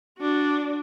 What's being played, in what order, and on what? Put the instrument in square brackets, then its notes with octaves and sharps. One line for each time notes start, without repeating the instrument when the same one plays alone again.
[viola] D4 F#4